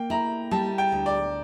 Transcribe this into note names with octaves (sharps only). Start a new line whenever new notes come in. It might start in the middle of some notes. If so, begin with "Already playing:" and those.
Already playing: A#3 G5
E4 A#5
G3 A5
G5
D2
D5